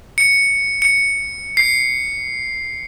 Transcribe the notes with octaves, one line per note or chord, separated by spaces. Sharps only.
C#7
C#7
C7